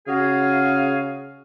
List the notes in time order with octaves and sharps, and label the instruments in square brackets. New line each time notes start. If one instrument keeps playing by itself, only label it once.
[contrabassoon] C#3 [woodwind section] F#4 G#4 F5